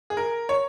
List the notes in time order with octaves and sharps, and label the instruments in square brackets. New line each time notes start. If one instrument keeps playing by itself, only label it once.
[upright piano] G#4
A#4
C#5